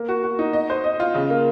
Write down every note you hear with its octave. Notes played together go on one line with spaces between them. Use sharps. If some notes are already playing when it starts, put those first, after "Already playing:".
Already playing: A#3
F#4
F#4
D#4
D#5
C5
D#5
F4
C#3
A#3